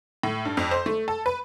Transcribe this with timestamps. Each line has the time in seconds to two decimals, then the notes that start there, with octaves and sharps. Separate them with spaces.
0.23 A2
0.45 G2
0.57 F2
0.71 C5
0.86 A3
1.08 A4
1.26 B4